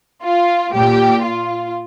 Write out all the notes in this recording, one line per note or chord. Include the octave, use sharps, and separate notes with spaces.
F4
A#2 G4
F4